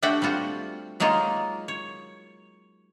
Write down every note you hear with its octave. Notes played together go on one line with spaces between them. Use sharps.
A3 D4 F#4 G4 F#5 G5
G3 C4 F4 F#4
F#3 G#3 A#3 D#4 F4
C#5